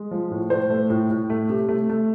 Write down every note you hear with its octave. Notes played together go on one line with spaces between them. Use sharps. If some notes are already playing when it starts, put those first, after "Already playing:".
Already playing: G#3
F3
A2
A2 C5
A3
A2
A2
A3
C3
A3
A3